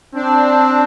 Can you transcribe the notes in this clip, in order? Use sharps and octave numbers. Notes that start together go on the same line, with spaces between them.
C4 D4